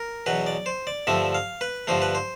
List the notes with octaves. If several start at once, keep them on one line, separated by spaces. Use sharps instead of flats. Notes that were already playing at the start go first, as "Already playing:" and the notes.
Already playing: A#4
E2 B2 F#3 B4
D5
C5
D5
G2 D3 F3 A3 E5
F5
B4
G2 D3 F3 A3 C5
B4
C5